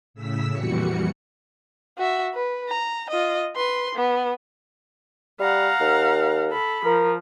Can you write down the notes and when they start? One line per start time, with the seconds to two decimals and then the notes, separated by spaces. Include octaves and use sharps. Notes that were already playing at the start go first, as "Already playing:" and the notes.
0.14 A2 C#3 E6 B6
0.53 F2 A#2 E3 G3 F#4 C#7
1.98 F#4 E5
2.34 B4
2.69 A#5
3.10 F4 D#5
3.56 B4 C6
3.95 B3
5.39 G3 F5 F#5 A#5
5.80 D#2
6.50 A4 B5
6.85 F3 A#4